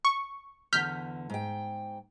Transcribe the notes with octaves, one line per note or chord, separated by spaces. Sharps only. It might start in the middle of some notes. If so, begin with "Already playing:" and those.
C#6
E2 D3 F6 G6 B6
G#2 G5